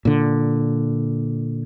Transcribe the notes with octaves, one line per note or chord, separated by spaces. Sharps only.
A#2 D3